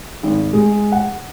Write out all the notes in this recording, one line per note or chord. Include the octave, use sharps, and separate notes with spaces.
G#1
G#3
F#5